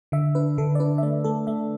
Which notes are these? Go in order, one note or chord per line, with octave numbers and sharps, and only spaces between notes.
D3 E5
D4 B4
D3 A4
D5
D4 B4
E5
A3 D5
A3 A4
A3 E5